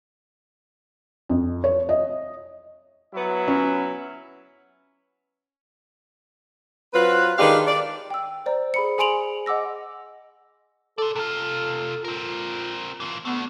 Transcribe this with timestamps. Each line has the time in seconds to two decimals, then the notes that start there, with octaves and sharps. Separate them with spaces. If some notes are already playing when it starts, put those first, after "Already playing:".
1.29 F2
1.64 C#5
1.89 D#5
3.14 F#3 B3 E4
3.48 C#4
6.94 F#3 C4 F4 B4
7.38 D#3 G#3 D4 G4 B4 F5
7.67 D5
8.10 G5 E6
8.46 C5 D5 A#5
8.74 G#4 B5 C#7
8.98 G#4 G#5 C6 D7 F7 F#7
9.46 D#5 F#5 D6 E6 A#6
10.98 A4 D5 C6
11.16 C3 F4 A4
12.05 C4 F4 A#4
13.00 E3 F4
13.25 A3 B3 D4